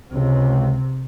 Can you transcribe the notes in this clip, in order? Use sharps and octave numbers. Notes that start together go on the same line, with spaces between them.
C#2 C3